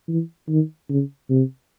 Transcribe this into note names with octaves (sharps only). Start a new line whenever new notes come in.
E3
D#3
C#3
C3